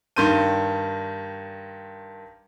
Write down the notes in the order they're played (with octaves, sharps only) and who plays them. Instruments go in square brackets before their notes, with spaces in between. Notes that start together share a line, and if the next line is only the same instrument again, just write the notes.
[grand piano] G2 D#3 C6 G6 D#7